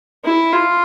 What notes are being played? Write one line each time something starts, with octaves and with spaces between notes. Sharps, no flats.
E4
F4